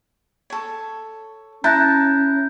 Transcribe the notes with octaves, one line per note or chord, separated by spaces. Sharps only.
A4 C#5
C#4 E4 A5 A#5 F#6 G6 A#6